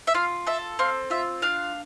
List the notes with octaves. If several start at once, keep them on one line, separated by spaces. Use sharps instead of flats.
E5
F4 F5
A4 E5
C4 F5
F4 E5
D4 F5